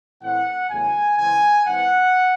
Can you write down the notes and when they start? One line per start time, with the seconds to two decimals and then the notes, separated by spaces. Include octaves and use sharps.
0.21 A2 E3 C4 F#5
0.69 E2 C#3 F#3 A3 G#5
1.17 C#3 E3 G#3 C4 G#5
1.65 G#2 E3 C4 F#5